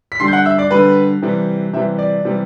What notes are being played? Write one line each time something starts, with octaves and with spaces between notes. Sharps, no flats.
B6
D3 G3 C6 C7
G6
F#5 F#6
E5 E6
D5 D6
D3 G3 B4 B5
C3 E3 G3
C3 E3 G3 E5
D5
C3 E3 G3